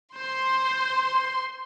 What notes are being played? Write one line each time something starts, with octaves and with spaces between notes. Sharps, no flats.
C5 C6